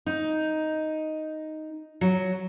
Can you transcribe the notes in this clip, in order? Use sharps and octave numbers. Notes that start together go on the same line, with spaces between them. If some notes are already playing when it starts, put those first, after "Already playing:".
D#4
F#3